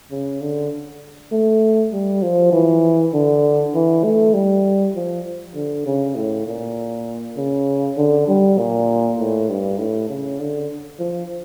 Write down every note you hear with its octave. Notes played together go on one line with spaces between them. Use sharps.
C#3
D3
A3
G3
F3
E3
D3
E3
A3
G3
F3
D3
C#3
A2
A#2
C#3
D3
G3
A#2
A2
G2
A2
C#3
D3
F3